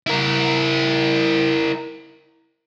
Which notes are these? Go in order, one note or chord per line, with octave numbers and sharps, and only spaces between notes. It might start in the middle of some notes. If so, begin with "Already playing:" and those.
E4 A#4